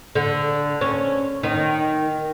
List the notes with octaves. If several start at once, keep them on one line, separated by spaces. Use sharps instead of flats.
D3
C#4
D#3